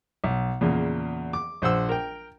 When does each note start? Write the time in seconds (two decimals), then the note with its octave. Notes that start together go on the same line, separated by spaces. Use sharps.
0.24 B1
0.61 E2 A#2 C#3
1.33 D6
1.62 A#1 C5 F#5 E6
1.89 A#4 G5